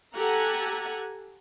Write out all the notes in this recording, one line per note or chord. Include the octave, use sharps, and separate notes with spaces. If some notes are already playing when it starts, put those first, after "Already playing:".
G4 A4 F#5 G#5 A#5